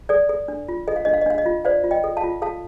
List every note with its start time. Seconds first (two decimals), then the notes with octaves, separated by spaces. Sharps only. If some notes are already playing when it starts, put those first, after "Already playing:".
0.09 A4 D5
0.29 A4
0.48 D4
0.68 F4
0.88 A4 D#5
0.96 F5
1.05 D4 D#5
1.13 F5
1.21 D#5
1.26 D4 F5
1.38 D#5
1.46 F4
1.65 C5 D5 F5
1.84 F4
1.91 D#5 G5
2.04 A4
2.17 F5 A5
2.23 F4
2.42 A4 F5 A5